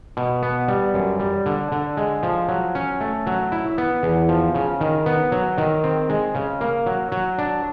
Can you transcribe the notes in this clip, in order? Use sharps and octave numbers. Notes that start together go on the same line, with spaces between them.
B2
B3
G3
F#2
G3
D3
D3
G#3
F3
F#3
C#4
A3
F#3
E4
B3
E2
F3
C#3
D#3
B3
F#3
D#3
C4
G#3
C#3
A#3
F#3
F#3
D4